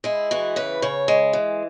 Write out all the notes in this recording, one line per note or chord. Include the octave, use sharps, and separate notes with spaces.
G#3 E4
E3 F#4
C#3 B4
C#3 C#5
G#3
E3